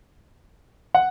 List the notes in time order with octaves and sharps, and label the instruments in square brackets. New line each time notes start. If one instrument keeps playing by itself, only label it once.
[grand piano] F#5